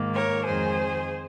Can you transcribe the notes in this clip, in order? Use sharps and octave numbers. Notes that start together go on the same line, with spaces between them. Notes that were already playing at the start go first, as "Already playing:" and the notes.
Already playing: G#2 D#3 A#3
A#4 C#5
F2 D#3 G#3 G#4 C5